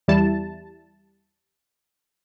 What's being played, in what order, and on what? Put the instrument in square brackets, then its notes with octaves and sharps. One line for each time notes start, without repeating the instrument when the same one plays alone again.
[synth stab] E2 G3 E4 A5